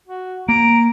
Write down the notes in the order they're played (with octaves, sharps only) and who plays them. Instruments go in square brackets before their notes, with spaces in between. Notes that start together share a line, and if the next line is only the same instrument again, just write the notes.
[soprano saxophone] F#4
[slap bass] A#3 [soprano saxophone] A#5 [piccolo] D7